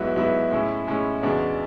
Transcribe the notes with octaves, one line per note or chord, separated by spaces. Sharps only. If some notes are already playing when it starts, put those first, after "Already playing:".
Already playing: G#2 F#3 B3 E4
G#2 F#3 B3 E4
A2 G#3 C#4 E4
A2 G#3 C#4 E4
E2 C#3 G#3 D4 F#4